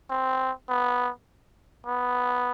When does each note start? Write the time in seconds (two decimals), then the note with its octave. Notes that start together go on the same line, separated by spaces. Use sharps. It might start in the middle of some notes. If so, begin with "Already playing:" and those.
0.10 C4
0.69 B3
1.87 B3